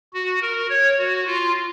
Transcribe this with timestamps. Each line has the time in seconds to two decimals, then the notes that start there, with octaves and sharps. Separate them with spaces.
0.13 F#4
0.41 A#4
0.70 C#5
0.98 F#4
1.26 F4